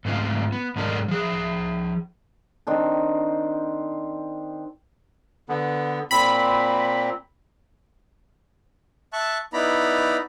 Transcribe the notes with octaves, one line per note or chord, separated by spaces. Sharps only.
G#2 A3 C4 F4
B3
G#2 B2 G#3 D4 A4 A#4
F3 G#4
D#3 C4 D4
D3 B3
A#2 C4 B5
E5 A5 C#6 F#6
B3 D#4 E4 D5 A#5 B5